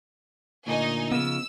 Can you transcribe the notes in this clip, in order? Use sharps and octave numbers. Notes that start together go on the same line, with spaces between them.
D2 A#2 D#4 G#5
C#3 F3 B3 E6